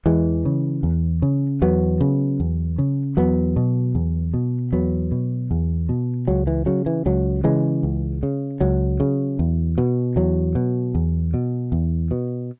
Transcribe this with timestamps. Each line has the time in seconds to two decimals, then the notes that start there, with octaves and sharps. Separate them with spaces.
0.06 E2 E3 G#3
0.45 C#3
0.83 E2
1.22 C#3
1.62 E2 F#3 B3
2.01 C#3
2.40 E2
2.78 C#3
3.17 E2 F#3 B3
3.56 B2
3.95 E2
4.34 B2
4.72 E2 F#3 B3
5.12 B2
5.51 E2
5.89 B2
6.28 C#2 F#3
6.47 E3
6.66 C#3 F#3
6.86 E3
7.06 C#2 F#3
7.44 C#3 E3 G#3
7.83 C#2
8.23 C#3
8.61 C#2 F#3
9.00 C#3
9.39 E2
9.78 B2
10.16 E2 F#3
10.55 B2
10.95 E2
11.34 B2
11.72 E2
12.11 B2